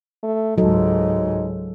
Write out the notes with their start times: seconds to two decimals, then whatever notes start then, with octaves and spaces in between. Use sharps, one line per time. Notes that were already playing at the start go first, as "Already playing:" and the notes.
0.23 A3
0.58 C#2 G#2 F#3 D#4 A4